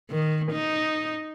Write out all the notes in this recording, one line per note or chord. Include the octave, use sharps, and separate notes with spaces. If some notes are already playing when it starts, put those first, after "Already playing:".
D#3
D#4